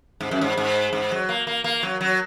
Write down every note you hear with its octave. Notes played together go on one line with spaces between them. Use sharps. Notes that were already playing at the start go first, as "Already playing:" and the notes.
G#2
F#2
G#2
G#2
G#2
F#3
A#3
A#3
A#3
F#3
F#3